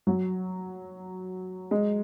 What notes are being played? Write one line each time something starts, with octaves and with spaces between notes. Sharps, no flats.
F#3
G#3